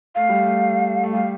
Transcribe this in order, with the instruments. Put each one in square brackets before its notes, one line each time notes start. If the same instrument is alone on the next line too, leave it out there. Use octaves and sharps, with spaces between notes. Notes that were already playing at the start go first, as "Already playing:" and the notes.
[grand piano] A3 [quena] F5
[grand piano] G3
A3
A3
[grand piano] G3 [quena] F5